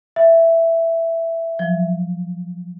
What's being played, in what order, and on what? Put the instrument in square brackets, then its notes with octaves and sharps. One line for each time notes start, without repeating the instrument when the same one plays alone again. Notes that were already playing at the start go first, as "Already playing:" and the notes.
[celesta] E5
[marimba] F3 F#3